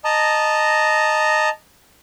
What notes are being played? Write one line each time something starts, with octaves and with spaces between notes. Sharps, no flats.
D#5 A5 A#5